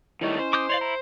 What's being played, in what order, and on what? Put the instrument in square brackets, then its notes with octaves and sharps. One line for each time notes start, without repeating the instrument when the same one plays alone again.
[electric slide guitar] D#3 G3 A3 [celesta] E4 D#5 C#6 [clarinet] C#5
[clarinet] C#4 [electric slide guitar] C5
[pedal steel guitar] D6 D#6 G6
[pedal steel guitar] C#5 D5 F5 [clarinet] C6
[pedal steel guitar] E4 [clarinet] A#5